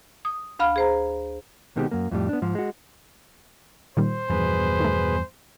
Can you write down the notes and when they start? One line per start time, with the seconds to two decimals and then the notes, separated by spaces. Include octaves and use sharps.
0.25 D#6
0.59 D2 F5 B5 F6
0.76 G#4 C5 A#5
1.76 B2 D#3 G#3 C4 G4
1.91 F#2 A#3
2.11 F2 A2 G3
2.29 B3 D4
2.42 G#2 F3
2.55 G#3 F#4
3.97 A#2 D#3 G3 C5
4.29 E2 G2 B2 F3 G#4 B4
4.80 D#3 A3